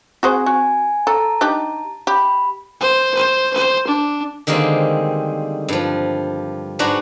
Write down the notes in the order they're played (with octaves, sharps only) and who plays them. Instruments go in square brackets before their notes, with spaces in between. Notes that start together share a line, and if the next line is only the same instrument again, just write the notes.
[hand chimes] C4 G#5 [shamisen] F#4 G#4 C5
[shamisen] F#4 [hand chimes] G#5
[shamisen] A4 [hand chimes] A5 A#5
[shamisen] D4 D#4 G4
[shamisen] G4 [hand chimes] B5
[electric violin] C5
C5
C5
D4
[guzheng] D3 D#3 G3 G#3 A#3 C4
G2 F3
G#2 D4 F#4 B4 F#5 A#5